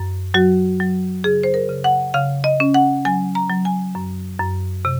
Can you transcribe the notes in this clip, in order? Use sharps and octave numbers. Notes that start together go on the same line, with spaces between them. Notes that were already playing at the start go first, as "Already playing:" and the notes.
Already playing: F#2
F#3 F#4
F#3
C#3 G#4
C5
A#4
C#3
F#5
C#3 F5
D#5
C#4
F#5
F#3 G#5
A#5
F#3
G#5
F#2
F#2
C3